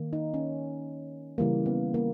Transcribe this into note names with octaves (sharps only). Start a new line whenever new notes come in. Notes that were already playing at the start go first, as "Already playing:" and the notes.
Already playing: D#3 A#3
D#4
C#4
C#3 E3 G3 A#3
B3
A#3